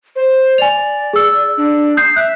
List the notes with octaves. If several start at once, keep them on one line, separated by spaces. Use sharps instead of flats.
C5
D5 G#5 F7
G#4 E6
D4
D#6 G6 C7
E5 F#6